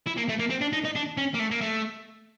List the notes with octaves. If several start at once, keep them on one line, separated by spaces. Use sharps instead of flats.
E4
A#3
A3
A#3
C4
D4
D#4
D#4
D4
C#4
A#3
A3
A#3
A3